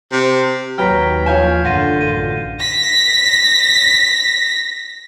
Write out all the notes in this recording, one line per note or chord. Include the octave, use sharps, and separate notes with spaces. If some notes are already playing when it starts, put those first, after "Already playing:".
C3
D#2 F#3 B4 G5 A#5 F6 B6
F3 C#5 F5 G#5 G6 E7
A1 F#2 D3 F4 F#5 G6 A#6 D#7
F4 D#7
A#6 B6